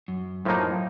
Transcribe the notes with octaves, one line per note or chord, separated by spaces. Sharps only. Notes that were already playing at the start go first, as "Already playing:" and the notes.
F#2
F#2 A2 F3 A#3 D#4